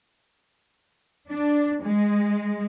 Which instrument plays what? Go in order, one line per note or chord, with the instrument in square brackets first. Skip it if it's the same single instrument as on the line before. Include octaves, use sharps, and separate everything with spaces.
[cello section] D4
G#3